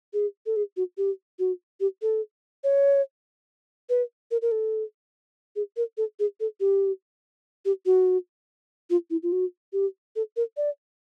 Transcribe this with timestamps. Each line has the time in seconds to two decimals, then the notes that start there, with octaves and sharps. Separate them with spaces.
0.13 G#4
0.46 A4
0.56 G#4
0.77 F#4
0.98 G4
1.39 F#4
1.80 G4
2.02 A4
2.64 C#5
3.90 B4
4.31 A#4
4.42 A#4
4.52 A4
5.56 G#4
5.77 A#4
5.98 A4
6.20 G#4
6.40 A4
6.60 G4
7.65 G4
7.86 F#4
8.90 F4
9.10 E4
9.23 F4
9.32 F#4
9.73 G4
10.16 A4
10.37 A#4
10.57 D5